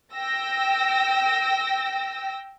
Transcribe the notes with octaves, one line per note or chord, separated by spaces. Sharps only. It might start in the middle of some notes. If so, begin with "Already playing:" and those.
G5 E6 A#6